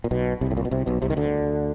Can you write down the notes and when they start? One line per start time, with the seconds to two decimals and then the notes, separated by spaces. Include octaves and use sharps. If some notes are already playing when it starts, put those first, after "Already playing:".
0.04 A#2
0.11 B1 B2
0.41 C2 C3
0.51 A2
0.57 A#2
0.65 B2
0.71 C2 C3
0.86 B1 B2
1.02 C2 C3
1.10 D#3
1.17 D2 D3